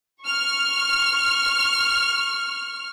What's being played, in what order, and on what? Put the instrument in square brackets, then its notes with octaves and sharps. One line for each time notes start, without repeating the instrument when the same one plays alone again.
[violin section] C#6 F6